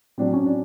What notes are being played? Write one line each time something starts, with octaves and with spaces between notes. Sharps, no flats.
A2 F#3 C4 D4
C#4
D4